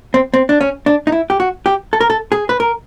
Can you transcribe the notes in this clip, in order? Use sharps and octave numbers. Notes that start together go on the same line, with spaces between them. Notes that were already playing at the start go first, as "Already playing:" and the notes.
C4
C4
D4
C#4
D4
D#4
E4
G4
F#4
G4
A4
A#4
A4
G#4
B4
A#4